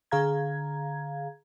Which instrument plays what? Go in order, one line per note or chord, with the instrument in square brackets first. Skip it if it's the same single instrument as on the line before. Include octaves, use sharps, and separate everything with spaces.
[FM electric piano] D3 G#4 F5 A#5 G#6